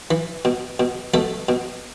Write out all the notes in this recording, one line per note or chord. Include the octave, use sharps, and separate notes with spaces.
E3
B2
B2
B2 A3 A4
B2